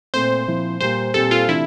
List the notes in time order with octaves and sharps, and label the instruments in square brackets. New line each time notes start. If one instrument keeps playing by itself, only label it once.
[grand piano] A#2 A3 C4 [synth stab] C5
[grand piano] A#2 F3 C4 E4
[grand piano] A#2 G3 A#3 [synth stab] C5
[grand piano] A#2 G3 C4 G4 [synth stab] A4
[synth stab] F4
[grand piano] C3 E3 A3 D4 [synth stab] E4